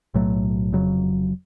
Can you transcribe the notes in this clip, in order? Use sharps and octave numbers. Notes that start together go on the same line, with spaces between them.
B1 A2 F#3 A3
F1 F2 C#3 F#3